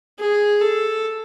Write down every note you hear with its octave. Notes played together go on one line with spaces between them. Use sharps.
G#4
A4